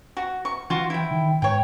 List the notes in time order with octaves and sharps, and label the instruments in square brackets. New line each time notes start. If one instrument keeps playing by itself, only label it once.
[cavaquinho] F#4
C#6
[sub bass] E3 [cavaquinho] F4 F#4
[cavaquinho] E4 G5
[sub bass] D#3
[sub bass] G#2 [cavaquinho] C#5 G5